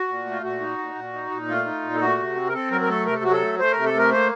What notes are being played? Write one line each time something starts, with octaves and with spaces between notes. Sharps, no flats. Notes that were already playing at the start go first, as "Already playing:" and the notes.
Already playing: F#4
A#2
A3
F4
A#2 F#4
D#4
A#2
A#2
D#4
A#2
A3 F4
D#4
A#2
A4
A3 F#4
C3
C4
A#4
C4 A4
F#3 A#4
A#4
A3 A4
C3 A#4
A4
F#3 F#4
A4
A3
A3 C5
C3 A#4
A4
A3 A#4
A#3 C5